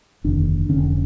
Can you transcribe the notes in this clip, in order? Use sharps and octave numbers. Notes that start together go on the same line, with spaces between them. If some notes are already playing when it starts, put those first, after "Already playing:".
F1 D#2 D3 D4
F1 D#2 D3 C#4